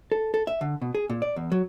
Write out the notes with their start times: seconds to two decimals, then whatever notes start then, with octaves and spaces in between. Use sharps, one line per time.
0.12 A4
0.34 A4
0.47 E5
0.61 D3
0.82 B2
0.95 G#4
1.10 A#2
1.22 D5
1.36 E2
1.52 F#3